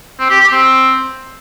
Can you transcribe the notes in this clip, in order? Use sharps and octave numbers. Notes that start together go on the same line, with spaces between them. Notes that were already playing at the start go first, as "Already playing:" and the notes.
C4
G4
G4
C4